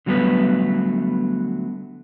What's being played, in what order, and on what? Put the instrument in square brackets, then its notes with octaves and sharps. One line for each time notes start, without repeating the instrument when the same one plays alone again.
[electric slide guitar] D3 F#3 G3 A3 B3 B4